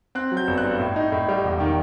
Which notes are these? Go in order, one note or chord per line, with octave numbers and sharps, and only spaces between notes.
C4 F#6
F#3
G6
G1
F#6
G2
A2
D#4
A2
G3
E1
D#3